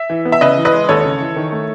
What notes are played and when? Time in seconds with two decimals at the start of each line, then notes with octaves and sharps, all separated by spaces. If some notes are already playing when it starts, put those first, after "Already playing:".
Already playing: E5
0.10 E3
0.25 B3
0.32 E5
0.41 C#3 B4 D#5
0.58 E3
0.65 B4 D#5
0.73 G#3
0.89 D#2 A4 C#5
1.05 C#3
1.21 E3
1.36 D#3
1.52 A3